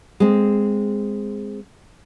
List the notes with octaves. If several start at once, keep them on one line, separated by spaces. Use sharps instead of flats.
G#3 C4